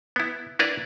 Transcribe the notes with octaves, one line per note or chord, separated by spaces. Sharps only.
B3 E4
D4 E4 A#4 B4 D5